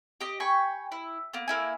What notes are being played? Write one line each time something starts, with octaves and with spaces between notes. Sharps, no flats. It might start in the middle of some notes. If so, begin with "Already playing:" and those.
G4 D#5
G5 G#5 B5 C#6
E4
A#3 B3
A#3 E4 G#5